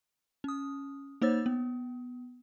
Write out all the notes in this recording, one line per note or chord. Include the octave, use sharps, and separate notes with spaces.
C#4 D#6
A#3 D#4 C5 C#5 E6 A6
B3